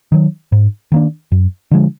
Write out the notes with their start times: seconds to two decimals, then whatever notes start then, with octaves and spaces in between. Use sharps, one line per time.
0.12 D#3 F#3
0.52 G#2
0.92 D#3 A#3 D4
1.32 F#2
1.71 D3 F3 G#3